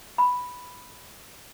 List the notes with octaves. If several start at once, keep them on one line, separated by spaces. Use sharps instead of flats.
B5